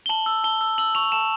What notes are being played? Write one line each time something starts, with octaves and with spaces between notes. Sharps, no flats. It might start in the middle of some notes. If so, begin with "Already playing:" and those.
G7
A5 F#7
E6
A5 G7
E6
E6 F#7
C#6 F7
A5 E7